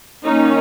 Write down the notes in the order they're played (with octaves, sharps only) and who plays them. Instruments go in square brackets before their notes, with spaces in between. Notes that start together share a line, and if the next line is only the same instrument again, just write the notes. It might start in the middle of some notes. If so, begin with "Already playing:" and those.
[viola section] D#3 A#3 C#4 D#4